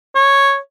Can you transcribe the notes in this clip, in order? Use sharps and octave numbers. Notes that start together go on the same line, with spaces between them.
C#5